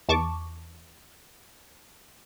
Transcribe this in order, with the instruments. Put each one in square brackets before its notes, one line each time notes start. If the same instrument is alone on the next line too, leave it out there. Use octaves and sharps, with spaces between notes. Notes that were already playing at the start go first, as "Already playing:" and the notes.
[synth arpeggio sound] E2 A5 C#6 D6